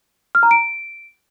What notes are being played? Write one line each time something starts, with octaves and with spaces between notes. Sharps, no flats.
F6
A#5
D7